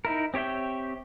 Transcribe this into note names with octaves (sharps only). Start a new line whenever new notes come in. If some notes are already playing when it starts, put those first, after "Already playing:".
D#4 E4 A#4
C4 G4 C#5 E5 G5